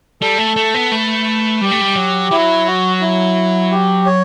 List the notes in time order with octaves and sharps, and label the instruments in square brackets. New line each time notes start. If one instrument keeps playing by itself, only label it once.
[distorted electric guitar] G3 [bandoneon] A4
[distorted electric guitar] A3
A3
B3
[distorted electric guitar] A3 [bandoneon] B4
[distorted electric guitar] G3 [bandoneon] G4
[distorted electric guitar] A3
G3
F#3
[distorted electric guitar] F#3 [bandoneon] E4
[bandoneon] F#4
E4
G4
C#5